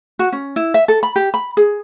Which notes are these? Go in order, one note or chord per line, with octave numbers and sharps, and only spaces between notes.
F#4
C#4
E4
E5
A4
B5
G4
B5
G#4